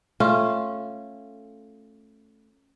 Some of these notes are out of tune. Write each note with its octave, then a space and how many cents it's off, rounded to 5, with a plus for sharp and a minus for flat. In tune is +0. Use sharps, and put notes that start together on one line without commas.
A3 +0 C#4 -10 F4 +0